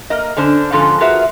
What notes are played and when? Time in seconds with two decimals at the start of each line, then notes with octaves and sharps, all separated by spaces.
0.10 A#3 A#4 D#5
0.37 D3 C#4 D4 C5
0.72 G#2 D3 F3 C#4 F4 A4
1.01 F4 F#4 G#4 A#4 B4 E5